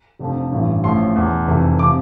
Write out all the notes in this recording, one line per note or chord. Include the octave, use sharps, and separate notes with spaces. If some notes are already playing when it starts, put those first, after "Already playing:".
F1 F2 D3 F3
A1 G2 E3
A1 A2 F3 C6
E2 B2
F1 F2 E3
D6
C3 F3